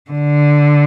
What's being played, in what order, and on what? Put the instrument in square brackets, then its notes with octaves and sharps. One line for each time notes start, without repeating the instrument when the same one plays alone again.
[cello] D3